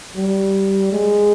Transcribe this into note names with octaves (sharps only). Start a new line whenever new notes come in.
G3
G#3